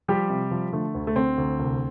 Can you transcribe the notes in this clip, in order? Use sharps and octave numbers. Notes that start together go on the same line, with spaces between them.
F3 G3 G4
C3
F3
D3 A3
D2
A3
D2 C4
D2
C2